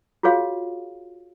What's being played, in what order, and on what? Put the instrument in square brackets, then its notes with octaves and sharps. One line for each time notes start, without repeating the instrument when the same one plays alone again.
[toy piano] F4 F#4 G#4 C#5 F5